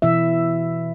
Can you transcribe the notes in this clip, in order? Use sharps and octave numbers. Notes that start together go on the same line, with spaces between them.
B2 E3 E4 E5